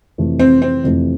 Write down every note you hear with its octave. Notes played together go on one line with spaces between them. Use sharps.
F2 C3 E3 A3
C4
C4
F2 C3 E3 A3